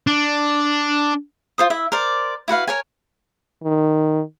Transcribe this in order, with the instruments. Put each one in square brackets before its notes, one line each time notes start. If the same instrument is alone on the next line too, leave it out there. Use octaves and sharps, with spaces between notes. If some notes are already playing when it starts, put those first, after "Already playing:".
[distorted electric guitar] D4
[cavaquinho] F4 C5 D#6
E4 E5
A#4 C5 D5
E4 F#4 B4 F5
A#4 C#5 G#5
[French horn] D#3